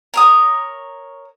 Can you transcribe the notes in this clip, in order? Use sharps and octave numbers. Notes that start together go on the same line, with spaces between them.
A#4 C#5 D#6